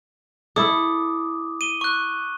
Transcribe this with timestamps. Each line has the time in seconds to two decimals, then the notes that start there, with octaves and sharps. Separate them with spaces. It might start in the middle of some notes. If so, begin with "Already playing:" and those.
0.56 E4 A4 D6 D#6
1.61 D#7 G7
1.81 C#6 F#6